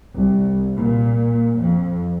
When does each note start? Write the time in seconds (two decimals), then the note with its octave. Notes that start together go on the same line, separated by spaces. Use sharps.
0.14 C2
0.76 A#2
1.59 F2